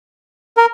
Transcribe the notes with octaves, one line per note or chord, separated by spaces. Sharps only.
A#4